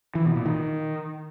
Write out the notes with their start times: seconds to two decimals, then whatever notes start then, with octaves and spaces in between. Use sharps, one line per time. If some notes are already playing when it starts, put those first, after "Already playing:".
0.15 E3
0.25 B2
0.35 A#2
0.46 D#3